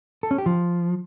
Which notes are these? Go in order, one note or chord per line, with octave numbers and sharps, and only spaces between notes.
A4
C#4
G4
F3